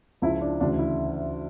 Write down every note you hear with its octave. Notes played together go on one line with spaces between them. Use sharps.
C#2 C#3 F3 E4
D4
D2 C#3 E3 D4
E4